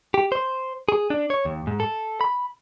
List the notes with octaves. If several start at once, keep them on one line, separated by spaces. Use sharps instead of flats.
G4
C5
G#4
D4
C#5
D#2
G#2
A4
B5